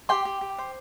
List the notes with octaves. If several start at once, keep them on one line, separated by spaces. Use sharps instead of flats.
G4 G5 C6
G4
G4
C5